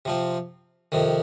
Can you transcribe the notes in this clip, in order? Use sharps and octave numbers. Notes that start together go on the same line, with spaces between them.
C3 F3 C4
F2 C3 D#3